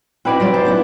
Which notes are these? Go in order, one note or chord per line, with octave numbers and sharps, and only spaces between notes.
C4 E4 F#4 B4 D5 D#5
F#3 G3 F4
G#2 C5 A5
B3 D4 E4